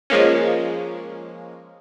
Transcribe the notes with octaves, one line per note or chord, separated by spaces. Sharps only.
F3 G#3 A#3 C#4